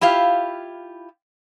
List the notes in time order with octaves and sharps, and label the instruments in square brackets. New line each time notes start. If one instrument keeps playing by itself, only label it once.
[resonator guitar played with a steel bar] E4 F4 G4 F5